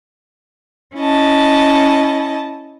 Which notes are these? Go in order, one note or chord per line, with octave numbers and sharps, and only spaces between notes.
C#4 E4 D#5 A5